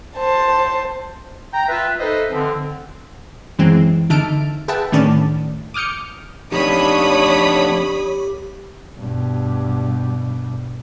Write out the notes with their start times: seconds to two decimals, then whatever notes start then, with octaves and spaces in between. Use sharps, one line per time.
0.18 C5 A5
1.53 G5 A#5
1.68 F4 B4 E5
2.00 D#4 A4 B4 C5 D#5 E5
2.30 D3 F3 C4
3.59 F#2 E3 G#3 C4
4.10 D3 D#4 E5 A5 F6 D7
4.68 G#4 B4 E5 F#5 G5 A5
4.92 A2 D#3 C#4 D4 D5 A5
5.74 D6 D#6 F6 G6 C#7
6.52 F2 D4 D#4 G4 C#5 B5 D#6
8.98 G2 B2